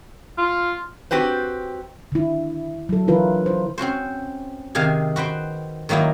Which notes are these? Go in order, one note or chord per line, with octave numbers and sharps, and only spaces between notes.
F4
C4 F#4 G4 B4 C5
D3 D#3 E4
F#3 A4
D3 E3 E4 F4 A#4 B4
C5
C4 C#4 F#4 C5
C3 D#3 G#4 F5 G#5
F#4 B4 C5 G5
D#3 F#3 A#3 D#4 E4